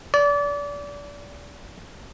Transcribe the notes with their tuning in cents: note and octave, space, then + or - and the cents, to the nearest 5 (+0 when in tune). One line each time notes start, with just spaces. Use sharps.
D5 -30